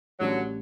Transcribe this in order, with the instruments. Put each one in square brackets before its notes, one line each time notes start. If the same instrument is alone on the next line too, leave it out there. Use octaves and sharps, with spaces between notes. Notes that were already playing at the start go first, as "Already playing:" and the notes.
[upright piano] A1 A2 G3 [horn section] D3 F#3